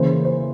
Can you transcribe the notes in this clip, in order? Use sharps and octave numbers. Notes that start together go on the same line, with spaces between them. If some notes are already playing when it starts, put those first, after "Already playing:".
Already playing: C#3 E3 A#3 E4 C5
C5